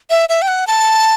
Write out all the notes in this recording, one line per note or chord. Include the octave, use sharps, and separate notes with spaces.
E5
E5
G5
F#5
A5